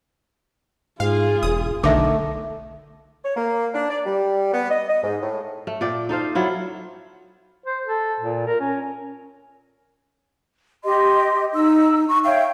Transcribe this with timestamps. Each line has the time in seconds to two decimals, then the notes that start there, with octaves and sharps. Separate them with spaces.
1.00 G#2 F4 G#4 F5
1.43 E1 D#6
1.83 B1 D3 D#3 A3 D#5 E5 D6
3.24 C#5
3.36 A#3
3.74 D4
3.90 D5
4.05 G3
4.53 B3
4.70 D#5
4.89 D#5
5.03 G#2
5.21 A2
5.67 A3
5.81 A#2 D5 G5
6.09 D#4 A4 C5 F5
6.35 F#3 E4 F4
7.66 C5
7.85 A4
8.21 A#2
8.47 A#4
8.61 C#4
10.84 G4 D#5 C6
11.54 D#4 D#5 E6
12.08 C#6
12.25 C#5 E5 F5 G5